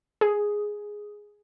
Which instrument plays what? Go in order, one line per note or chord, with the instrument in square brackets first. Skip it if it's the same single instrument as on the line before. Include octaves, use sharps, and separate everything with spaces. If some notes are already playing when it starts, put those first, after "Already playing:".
[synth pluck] G#4